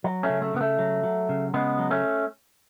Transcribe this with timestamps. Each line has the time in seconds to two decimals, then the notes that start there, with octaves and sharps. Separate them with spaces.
0.04 F#3
0.23 A3 C#4
0.29 C#3
0.42 A3
0.54 C#3 B3
0.61 A3
0.79 F#3
1.03 F#3
1.29 C#3
1.54 C#3 G#3 B3
1.79 F#3
1.90 A3 C#4